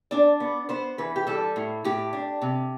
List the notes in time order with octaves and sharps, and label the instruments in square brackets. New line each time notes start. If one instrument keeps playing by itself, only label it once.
[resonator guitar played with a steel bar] D4 D5
B3
B3 C5
E3 B4
G4
G3 A4
A2
A2 G4
D4
C3